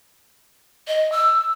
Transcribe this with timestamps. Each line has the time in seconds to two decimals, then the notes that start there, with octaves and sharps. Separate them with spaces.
0.88 D#5
1.12 E6